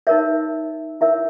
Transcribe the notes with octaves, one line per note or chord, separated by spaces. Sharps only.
D#4 A#4 C#5 E5
E4 A#4 C#5 E5